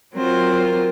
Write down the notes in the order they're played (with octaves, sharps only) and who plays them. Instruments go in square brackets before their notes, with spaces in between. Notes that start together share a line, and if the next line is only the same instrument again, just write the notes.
[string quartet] F#3 C4 F4 C5 [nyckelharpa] A#4